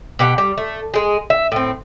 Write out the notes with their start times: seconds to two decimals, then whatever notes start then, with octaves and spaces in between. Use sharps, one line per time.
0.19 B2 G4 F#5
0.38 G3
0.58 A3
0.94 G#3 G#4
1.30 E5
1.52 A2 C4